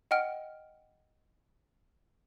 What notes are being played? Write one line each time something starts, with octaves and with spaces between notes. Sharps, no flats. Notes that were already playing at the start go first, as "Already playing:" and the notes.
D#5 F#5 G5 F6 D7